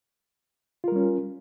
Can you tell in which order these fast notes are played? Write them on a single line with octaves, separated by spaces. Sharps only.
F4 A#4 G3 C#4